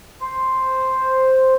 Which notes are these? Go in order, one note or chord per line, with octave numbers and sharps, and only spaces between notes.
C5